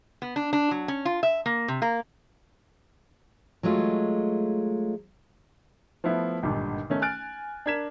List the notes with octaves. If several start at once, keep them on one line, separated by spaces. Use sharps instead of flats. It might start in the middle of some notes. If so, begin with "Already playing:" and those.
B3
D4
D4
F#3
C#4
F4
E5
A#3
C3
A#3
F#3 G#3 A3 F4
F3 A3 B3 E4
G#1 G2 A#2 D3 D#3
D#3 A3 C#4
G#5 F6 F#6 A6 D7
D4 A#4 G#6 B6 E7